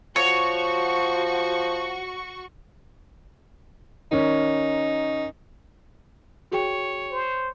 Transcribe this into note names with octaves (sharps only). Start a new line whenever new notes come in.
F3 F#4 C#5 C#6
D#3 C#4 D#4
F#4 G#4 C#5 G5
C5